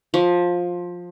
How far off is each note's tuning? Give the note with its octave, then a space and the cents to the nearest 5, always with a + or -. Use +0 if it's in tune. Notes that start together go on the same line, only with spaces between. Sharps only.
F3 +15